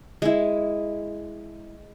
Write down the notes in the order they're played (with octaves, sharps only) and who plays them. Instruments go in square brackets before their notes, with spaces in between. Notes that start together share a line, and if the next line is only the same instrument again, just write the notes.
[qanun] G#3 E4